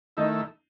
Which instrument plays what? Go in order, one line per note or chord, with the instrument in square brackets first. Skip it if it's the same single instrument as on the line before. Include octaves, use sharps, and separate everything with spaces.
[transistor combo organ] D#3 A3 E4 [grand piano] D#4